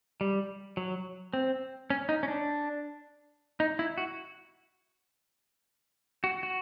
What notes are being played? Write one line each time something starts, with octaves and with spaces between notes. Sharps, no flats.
G3
F#3
C4
C#4
D#4
C#4
D4
D#4
E4
F#4
F#4
F#4